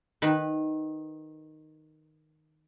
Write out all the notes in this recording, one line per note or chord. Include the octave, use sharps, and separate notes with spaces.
D#3 B4